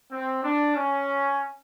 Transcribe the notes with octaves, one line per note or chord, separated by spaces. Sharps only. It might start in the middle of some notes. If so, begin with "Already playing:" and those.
C4
D4
C#4